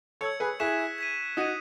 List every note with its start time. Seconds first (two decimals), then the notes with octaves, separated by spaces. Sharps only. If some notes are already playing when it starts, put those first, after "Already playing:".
0.21 A4 C#5 E6 G#6 C#7
0.40 G#4 B4
0.60 E4 G#4 C#6 F#6 B6 E7
0.98 G#6 B6 D#7
1.37 D#4 F#4 D#6 G#6 D#7